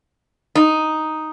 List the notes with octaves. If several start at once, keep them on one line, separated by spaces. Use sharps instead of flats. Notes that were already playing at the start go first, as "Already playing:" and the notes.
D#4